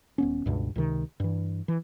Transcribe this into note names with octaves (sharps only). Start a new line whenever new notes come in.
D#1 B3 C#4
C#2 G2 B2
C#2 C3 D#3
G2 E3
E3